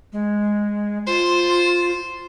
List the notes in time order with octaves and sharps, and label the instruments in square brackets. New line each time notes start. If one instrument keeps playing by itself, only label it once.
[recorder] G#3
[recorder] F4 [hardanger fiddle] C5